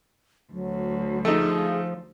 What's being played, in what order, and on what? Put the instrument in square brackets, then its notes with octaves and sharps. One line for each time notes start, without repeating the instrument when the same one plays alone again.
[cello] D2 [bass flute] F#3
[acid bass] F3 [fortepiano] A3 D#4 [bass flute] G#4